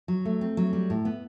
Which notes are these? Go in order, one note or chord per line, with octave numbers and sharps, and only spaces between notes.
F#3
A3
C4
F#3
G3
A2
B3